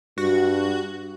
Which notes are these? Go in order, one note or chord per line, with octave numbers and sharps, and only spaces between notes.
G2 F#4